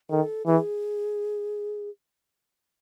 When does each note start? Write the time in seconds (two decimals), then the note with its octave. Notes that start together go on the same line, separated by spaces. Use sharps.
0.10 D#3 A4
0.46 E3 G#4